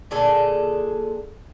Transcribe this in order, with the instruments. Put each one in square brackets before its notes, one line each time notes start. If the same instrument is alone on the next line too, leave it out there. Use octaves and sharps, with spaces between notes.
[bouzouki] A#2 D3 G#4 A4